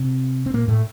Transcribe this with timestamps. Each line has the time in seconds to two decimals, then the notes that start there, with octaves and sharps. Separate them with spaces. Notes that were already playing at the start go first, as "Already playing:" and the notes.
Already playing: C3 C4
0.46 C4
0.54 A#2 A#3
0.68 A2 A3